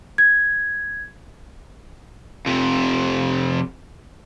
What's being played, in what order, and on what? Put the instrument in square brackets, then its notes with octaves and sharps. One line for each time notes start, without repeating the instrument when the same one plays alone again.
[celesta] G#6
[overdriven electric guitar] F2 C3